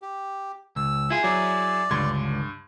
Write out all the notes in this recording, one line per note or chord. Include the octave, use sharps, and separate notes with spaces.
G4
C#2 E6
E4 F4 G#4
F#3 D5 G#6
C#2 G2 D3 C6 G#6